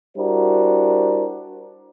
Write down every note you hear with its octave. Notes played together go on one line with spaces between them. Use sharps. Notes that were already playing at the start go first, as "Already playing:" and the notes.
G3 D4 E4 F#4 A#4 C5